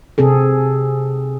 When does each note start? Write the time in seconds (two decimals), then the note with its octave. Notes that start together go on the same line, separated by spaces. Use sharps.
0.18 C3 C4 G#4 A4